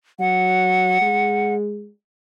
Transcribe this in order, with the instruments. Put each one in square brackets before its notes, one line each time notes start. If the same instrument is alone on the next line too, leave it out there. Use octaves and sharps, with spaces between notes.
[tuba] F#3 [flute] F#5
[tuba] G#3